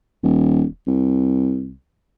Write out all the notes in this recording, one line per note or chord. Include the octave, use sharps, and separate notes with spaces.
D#1
C2